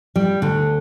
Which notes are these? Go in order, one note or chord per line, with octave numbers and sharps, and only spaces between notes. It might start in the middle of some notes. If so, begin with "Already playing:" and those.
G3
D2 D3